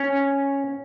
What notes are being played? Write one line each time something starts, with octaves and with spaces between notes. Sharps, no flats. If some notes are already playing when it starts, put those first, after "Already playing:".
Already playing: C#4